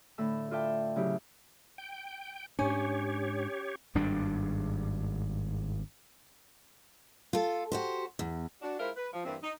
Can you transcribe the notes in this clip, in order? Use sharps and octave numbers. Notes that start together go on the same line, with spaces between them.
A2 D3 A4 B5 E6
F4 A4 D5 E5 G5 A5
C#3 F#3 E4 G4
G5
G#2 C#4 D4 G4 C#5
G#1 G2 G3 D4
F4 A4
F#4 G4 C5
E2
D4 F#4
G#3 E4 F4 A#4 C5 E5
B4
F3
G2 E3 G3 A#3 C4
D#4